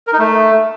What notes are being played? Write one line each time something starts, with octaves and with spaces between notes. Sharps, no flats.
A#4
D#4
A3